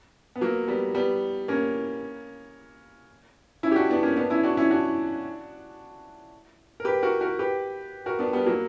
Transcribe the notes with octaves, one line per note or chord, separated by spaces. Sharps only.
B3
F#3 A#3
G3 B3
G3 B3
A#3 C#4
C#4 E4
G4
D4 F#4
B3 D4
A#3 C#4
B3 D4
C#4 E4
D4 F#4
C#4 E4
D4 F#4
A#4
G4 B4
F#4 A#4
F#4 A#4
G4 B4
F#4 A#4
B3 D4
G3 B3
F#3 A#3